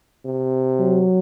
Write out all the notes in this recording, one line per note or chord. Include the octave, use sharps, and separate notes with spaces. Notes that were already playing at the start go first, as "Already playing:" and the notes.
C3
F#3